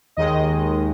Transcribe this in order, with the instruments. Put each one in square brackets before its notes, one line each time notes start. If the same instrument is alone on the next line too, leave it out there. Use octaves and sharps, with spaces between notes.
[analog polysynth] D#2 D#3 G#3 D#5